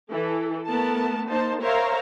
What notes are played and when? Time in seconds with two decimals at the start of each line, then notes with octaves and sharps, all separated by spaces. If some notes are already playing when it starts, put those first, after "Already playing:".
0.11 E3 A4
0.68 A3 B3 A#4 A5
1.29 A#3 D#4 C5 A5
1.63 A#4 C5 C#5 E5 F5 A#5